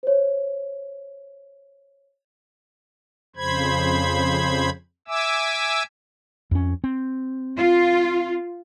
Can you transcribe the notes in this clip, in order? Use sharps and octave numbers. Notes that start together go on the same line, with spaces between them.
C5 C#5
F2 C#3 C5 B5 G#6
E5 G#5 D6 E6
F2 C#4
C4
F4